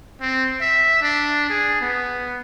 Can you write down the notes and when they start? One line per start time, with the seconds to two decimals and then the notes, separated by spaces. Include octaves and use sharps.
0.21 C4
0.61 E5
1.02 D4
1.50 G#4
1.81 B3